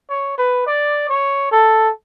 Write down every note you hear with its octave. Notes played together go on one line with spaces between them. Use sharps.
C#5
B4
D5
C#5
A4